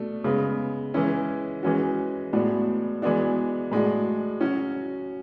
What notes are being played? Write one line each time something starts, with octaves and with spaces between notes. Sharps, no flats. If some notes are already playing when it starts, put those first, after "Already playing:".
Already playing: B2 A3 D4
C#3 G#3 B3
E3 G#3 C#4 E4
E3 G#3 C#4 F#4
A2 G#3 B3 D4 F#4
E3 G#3 B3 D4 F#4
A2 G#3 D4 F#4
F#3 C#4 F#4